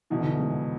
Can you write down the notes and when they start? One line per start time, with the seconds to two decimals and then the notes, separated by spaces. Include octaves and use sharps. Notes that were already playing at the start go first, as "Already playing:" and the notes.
0.10 F1 E2 B2 E3
0.18 D3
0.25 E3
0.39 G#3